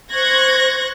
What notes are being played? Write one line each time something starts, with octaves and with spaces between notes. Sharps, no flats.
C5 C#6 F#6 G#6 A#6